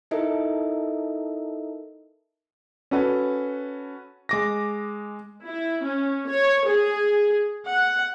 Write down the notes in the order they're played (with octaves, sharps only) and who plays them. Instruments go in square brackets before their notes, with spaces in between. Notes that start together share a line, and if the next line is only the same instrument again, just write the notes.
[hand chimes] D#4 E4 A4 A#4 D#5 E5
[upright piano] C#4 F#4 A4 B4
[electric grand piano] G#3 D6 A#6
[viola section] E4
C#4
C#5
G#4
F#5